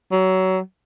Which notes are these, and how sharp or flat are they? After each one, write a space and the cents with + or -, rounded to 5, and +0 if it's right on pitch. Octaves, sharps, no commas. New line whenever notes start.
F#3 +25